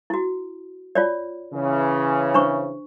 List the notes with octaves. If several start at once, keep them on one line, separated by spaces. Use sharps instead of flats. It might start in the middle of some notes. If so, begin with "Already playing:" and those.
E4 F#4
F4 C#5 D5
C#3 E3
D4 C5 C#6